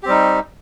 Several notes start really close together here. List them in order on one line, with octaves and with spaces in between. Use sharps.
G4 C4 G3 D#4